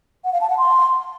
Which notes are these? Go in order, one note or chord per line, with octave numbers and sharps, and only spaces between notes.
F#5
F5
A5
F#5
C6